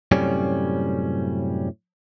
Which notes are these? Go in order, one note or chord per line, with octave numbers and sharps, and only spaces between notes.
F#2 A2 C3 G3 C#4